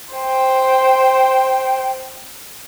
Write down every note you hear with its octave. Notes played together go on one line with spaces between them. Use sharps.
C5 G5